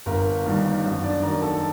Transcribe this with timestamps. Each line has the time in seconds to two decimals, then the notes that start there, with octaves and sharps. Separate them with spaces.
0.06 G1 A#4
0.45 G2 D#3 G3
0.84 F#2
1.03 D4 D5
1.22 D#3 F#3 A#4 A#5
1.42 A4 A5